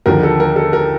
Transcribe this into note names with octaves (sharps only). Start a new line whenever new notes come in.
D#2 D3 F3 A#4
A4
A#4
A4
A#4